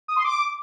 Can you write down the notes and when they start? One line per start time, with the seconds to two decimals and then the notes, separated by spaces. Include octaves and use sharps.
0.08 D#6
0.16 C6
0.24 D6